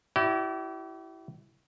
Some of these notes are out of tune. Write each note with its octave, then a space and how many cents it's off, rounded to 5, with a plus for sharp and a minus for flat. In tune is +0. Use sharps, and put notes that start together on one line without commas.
E4 +0 G4 -45 D5 +10